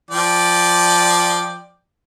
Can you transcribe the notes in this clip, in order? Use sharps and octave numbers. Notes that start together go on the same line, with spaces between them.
F3 D5 G5